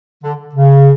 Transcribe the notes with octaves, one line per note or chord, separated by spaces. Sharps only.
D3
C#3